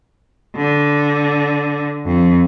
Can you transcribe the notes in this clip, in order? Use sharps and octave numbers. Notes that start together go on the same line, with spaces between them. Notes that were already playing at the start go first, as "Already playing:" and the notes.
D3
F2